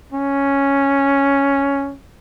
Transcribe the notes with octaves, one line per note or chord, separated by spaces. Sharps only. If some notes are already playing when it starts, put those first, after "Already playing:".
C#4